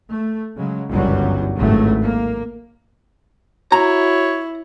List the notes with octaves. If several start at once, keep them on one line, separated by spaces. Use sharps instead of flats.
A3
C#3 F#3 G#3
G1 C#2 F#2 E3 F#3 G3
G#1 C#2 A2 F#3 A3
A#3
E4 F#4 C#5 A#5